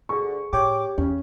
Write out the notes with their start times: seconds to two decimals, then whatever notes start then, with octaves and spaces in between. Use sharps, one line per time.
0.09 D2 G2 D3 G#4 C#6
0.53 A2 G4 C#5 G5 D6
0.98 E2 C#3 C#4